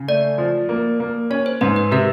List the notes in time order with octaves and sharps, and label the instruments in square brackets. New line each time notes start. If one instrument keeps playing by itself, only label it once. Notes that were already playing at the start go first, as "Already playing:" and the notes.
Already playing: [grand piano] C#3
[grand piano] A3 [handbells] D5
[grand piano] F3
A#3
A#3
[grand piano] C#4 [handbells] C#5
[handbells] C5
[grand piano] G#2 [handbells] B4
[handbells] B4
[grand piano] C3 [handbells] A#4